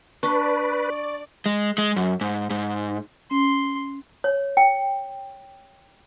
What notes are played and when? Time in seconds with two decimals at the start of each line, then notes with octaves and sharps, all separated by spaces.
0.23 D4 B4 D5 C#6
1.46 G#3
1.78 G#3
1.96 F#2
2.21 G#2
2.50 G#2
3.31 C#4 C6
4.24 C#5
4.57 G5